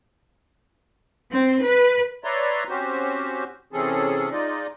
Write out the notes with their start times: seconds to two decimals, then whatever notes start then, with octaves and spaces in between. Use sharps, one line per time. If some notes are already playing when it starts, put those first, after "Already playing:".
1.31 C4
1.64 B4
2.24 B4 C#5 D5 E5 A#5 C6
2.69 C4 C#4 F#4 G4 C5
3.73 C3 E3 C4 C#4 G#4 A4
4.31 G#3 D#4 F4 D5 D#5